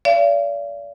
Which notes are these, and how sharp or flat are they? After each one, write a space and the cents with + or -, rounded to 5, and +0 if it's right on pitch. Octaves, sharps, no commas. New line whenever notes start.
D5 -35 F5 -40